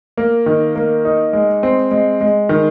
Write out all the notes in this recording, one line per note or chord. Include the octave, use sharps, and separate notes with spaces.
A#3
D#3
A#3
D#4
G#3
C4
G#3
G#3
D#3